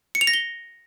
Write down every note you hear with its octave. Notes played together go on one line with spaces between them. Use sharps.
C#7
F7
A#6
G7